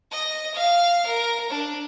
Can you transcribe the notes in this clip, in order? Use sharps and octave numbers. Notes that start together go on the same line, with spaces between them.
D#5
F5
A#4
D4